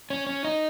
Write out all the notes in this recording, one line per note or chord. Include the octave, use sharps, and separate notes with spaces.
C#4
C#4
D#4